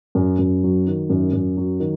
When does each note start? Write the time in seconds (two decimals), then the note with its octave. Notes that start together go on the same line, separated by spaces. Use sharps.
0.15 F#2
0.39 F#2
0.63 F#3
0.87 D#3
1.10 F#2
1.33 F#2
1.57 F#3
1.80 D#3